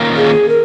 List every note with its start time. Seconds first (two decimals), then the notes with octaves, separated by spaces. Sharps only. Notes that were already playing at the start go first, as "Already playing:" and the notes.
Already playing: D#3 A#3 C#4 F4 A#4
0.17 G#4
0.49 A#4